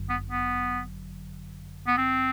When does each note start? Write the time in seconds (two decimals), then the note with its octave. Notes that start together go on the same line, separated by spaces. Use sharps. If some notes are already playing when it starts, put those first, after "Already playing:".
Already playing: G1 F#2 D3 F#3
0.09 B3
0.30 B3
1.87 B3
1.98 C4